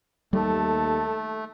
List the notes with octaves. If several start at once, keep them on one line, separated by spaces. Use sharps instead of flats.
D#2 G3 A3 A4